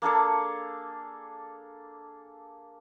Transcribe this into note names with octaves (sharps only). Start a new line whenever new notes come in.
A#3 D4 G#4 A4